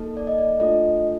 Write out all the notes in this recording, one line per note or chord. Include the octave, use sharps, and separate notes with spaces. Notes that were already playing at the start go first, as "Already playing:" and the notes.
Already playing: A#3 D#4 A4
D5
D#5
D5
A3 D4 F4 A4 D#5